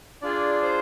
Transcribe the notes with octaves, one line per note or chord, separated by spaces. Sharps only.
D4 F4 G#4 D5
C5